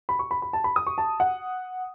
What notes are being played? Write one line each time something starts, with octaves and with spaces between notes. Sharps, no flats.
B5
C#6
B5
B5
A5
B5
D#6
C#6
A5
F#5